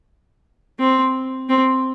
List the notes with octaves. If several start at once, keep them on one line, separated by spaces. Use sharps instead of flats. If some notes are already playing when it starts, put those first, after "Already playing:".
C4
C4